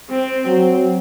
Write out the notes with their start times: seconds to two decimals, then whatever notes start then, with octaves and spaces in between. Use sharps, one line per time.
0.10 C4
0.46 F#3